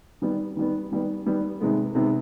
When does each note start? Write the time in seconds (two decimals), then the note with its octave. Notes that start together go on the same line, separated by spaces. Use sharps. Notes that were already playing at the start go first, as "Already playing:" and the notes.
0.22 D#3 G3 B3
0.57 D#3 G3 B3
0.92 D#3 G3 B3
1.26 D#3 G3 B3
1.60 C3 D#3 G#3 B3
1.95 C3 D#3 G#3 B3